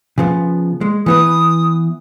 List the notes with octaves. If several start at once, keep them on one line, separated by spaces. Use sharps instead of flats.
C#3 F3 B3
G#3
E3 B3 B4 D#6